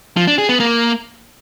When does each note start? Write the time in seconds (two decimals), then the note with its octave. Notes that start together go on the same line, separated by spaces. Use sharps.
0.17 F3
0.28 D4
0.38 G#4
0.49 B3
0.60 A#3